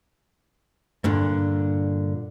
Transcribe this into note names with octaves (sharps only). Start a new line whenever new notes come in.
G2 A#2 D3